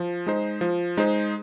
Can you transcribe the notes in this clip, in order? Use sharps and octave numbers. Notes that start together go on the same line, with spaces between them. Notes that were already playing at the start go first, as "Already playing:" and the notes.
Already playing: F3
G#3 D#4 C5
F3
G#3 D#4 C5